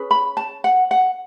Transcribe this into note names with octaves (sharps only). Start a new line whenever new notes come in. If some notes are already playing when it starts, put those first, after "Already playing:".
Already playing: C#4 G#4 B4
B5
A5
F#5
F#5